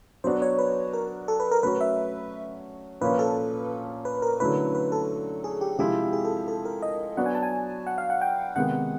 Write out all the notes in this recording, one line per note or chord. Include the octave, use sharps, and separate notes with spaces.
F#3 B3 D4 F#4 C5
C#5
B4
A#4
A4
B4
A#4
F#3 A3 C#4 F#4 B4
E5
A#2 F3 A#3 C#4 B4
A4
B4
A#4
D3 F#3 A3 C#4 E4 B4
B4
A4
G#4
G4
C3 F3 G#3 C4 E4 G4
G#4
A4
A4
A#4
D#5
F#3 B3 D4 F#4 F#5
G#5
A5
G#5
F#5
F5
F#5
G5
C3 D#3 G#3 B3 F#5